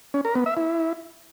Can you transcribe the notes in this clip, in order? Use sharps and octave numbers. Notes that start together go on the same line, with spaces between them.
C#4
A#4
B3
E5
E4